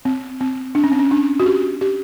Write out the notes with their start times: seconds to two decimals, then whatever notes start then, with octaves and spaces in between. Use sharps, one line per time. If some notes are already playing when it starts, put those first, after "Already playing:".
0.05 C4
0.41 C4
0.75 D4
0.84 C#4
0.92 C4
0.99 C#4
1.11 D4
1.40 F#4
1.46 G4
1.81 G4